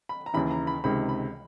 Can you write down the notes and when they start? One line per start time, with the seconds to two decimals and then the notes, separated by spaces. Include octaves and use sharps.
0.09 B5
0.26 A#5
0.34 D#2 C#3 E3 B5
0.51 A#5
0.67 B5
0.84 C#2 C3 D#3 G#3 B5
1.09 B5